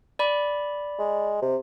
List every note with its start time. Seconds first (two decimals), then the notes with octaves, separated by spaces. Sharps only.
0.19 D5 B5
0.99 G#3
1.42 C3